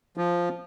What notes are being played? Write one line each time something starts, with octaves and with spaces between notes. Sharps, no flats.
F3